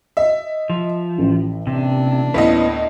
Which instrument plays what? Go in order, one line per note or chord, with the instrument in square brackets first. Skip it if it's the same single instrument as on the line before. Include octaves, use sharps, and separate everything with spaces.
[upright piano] D#5 [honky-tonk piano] E5
[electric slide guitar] F3
[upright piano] A1 [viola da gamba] A2
[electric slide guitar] C3 [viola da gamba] A#3 D4
[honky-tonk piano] D2 A2 D#5 [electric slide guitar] B3 C#4 B4